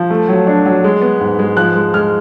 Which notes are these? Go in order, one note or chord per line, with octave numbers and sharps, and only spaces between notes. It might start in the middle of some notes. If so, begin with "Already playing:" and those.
Already playing: F3
A3
F#3
D4
F#3
G#3
B3
G#2
G#3
F3 F#6
G#3
G#3 F6